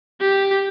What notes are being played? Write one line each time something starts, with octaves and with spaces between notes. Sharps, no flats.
G4